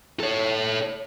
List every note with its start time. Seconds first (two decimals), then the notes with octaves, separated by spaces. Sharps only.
0.20 A4 C#5